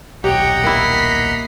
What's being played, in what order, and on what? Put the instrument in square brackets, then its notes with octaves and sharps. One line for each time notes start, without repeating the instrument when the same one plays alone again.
[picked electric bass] D#1 B1 [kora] G4 [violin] C#5 G5 [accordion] D#5 F#5 A#5
[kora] A#3 E4 [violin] B6 C7